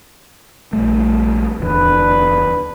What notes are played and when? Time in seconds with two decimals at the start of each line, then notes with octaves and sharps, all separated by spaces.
0.73 A#1 G3 A3
1.60 D1 E2 D4 B4